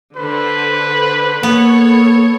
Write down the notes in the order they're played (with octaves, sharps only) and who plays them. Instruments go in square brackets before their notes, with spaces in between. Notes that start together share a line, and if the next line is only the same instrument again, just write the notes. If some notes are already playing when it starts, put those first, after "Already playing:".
[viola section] D3 C5 [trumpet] B4
[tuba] A#3 [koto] B3 [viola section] A4 C#5